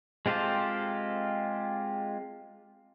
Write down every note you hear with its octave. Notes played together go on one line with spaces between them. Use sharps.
G#3 C4 F4 G4 A4